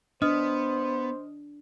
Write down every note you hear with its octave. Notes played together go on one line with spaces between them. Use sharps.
B3 D4 C5 D#5 D#6 F6